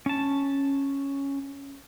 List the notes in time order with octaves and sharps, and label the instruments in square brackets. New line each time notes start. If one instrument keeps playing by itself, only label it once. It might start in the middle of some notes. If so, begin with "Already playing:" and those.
[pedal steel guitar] C#4 A5